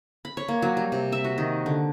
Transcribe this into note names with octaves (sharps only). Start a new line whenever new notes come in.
B5
C#5
A#3
F#3
G3
C3
E5
F#4
D#3
D3